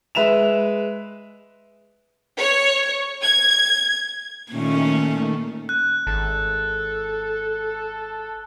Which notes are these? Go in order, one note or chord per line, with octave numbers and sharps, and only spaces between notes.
G#3 B4 E5 E7 F7
C#5
G#6
A#2 D#3 A3 C#4
F#6
G#1 A4